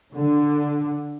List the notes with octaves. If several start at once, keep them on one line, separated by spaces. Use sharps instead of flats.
D3